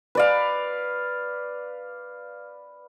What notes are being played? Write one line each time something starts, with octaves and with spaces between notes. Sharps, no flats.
B4 D5 F5